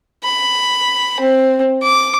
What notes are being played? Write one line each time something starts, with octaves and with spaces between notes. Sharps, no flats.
B5
C4
D6